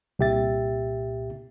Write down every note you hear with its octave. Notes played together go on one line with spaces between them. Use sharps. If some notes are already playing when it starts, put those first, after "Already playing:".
C2 A#2 G4 E5 A6